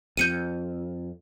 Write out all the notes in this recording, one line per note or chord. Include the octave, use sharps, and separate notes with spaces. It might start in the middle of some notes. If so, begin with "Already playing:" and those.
F2 G6 C#7 D#7